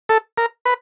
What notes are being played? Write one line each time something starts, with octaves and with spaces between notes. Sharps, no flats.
A4
A#4
B4